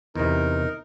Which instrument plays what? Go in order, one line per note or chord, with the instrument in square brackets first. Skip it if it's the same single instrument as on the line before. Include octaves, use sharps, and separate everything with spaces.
[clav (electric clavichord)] E2 C3 [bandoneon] D#4 A#4